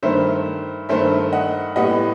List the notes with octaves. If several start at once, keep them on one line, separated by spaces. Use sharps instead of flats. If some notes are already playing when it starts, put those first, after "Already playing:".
G2 D#3 A3 C5 E5
G2 D#3 A3 C5 E5
D#5 F#5
A2 G3 B3 D#5 F#5